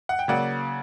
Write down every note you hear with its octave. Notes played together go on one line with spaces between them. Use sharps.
F#5
G5
C#3 F#3 A#3 D5 F#5